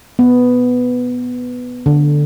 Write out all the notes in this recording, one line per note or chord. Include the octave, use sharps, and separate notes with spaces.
B3
D3